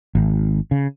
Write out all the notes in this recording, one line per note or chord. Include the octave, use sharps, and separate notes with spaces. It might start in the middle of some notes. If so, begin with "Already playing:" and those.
G#1
C#3